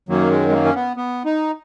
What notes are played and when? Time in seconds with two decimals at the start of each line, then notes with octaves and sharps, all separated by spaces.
0.09 F#2 D#3 F#3 A#3
0.31 G#3
0.49 G#3
0.52 A#3
0.64 C#4
0.75 B3
0.97 B3
1.25 D#4